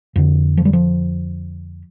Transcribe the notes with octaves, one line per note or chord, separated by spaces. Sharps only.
F2 D3
F3
G3
F3